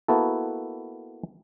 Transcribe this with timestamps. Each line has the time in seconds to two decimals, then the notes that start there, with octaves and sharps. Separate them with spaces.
0.08 A#3 B3 E4 F#4 A4